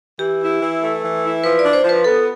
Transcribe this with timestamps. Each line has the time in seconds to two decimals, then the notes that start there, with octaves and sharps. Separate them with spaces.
0.19 E3 G4
0.41 E4
0.61 E3
0.82 A3
1.02 E3
1.22 E4
1.43 F3 B4
1.59 D5
1.63 D4
1.73 C5
1.84 F3
1.89 B4
2.04 B3 A4